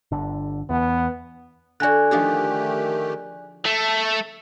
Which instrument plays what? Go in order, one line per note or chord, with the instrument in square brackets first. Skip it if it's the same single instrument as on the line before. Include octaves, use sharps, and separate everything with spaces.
[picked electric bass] G1 D3
[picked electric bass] E2 [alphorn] B3
[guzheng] D3 F#4 [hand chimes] D5 G#5 F#6
[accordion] D#3 A3 G4 [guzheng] F3 D4 G#4
[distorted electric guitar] A3 [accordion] E5 A5